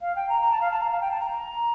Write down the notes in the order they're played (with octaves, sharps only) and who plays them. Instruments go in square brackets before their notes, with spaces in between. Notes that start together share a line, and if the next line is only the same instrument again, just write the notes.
[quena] F5
G5
A#5
A#5
A5
F5
A5
A#5
F5
G5
A5
A#5